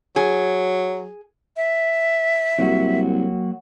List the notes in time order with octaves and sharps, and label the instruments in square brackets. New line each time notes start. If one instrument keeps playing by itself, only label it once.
[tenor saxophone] F#3 [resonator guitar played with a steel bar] G#4
[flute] E5
[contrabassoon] C2 [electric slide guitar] F#3 A#3 F#4